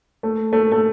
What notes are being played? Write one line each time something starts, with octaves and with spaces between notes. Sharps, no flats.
A3
A3
A3